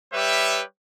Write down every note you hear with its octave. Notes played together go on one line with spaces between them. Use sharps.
G3 G4 B4 C#5 E5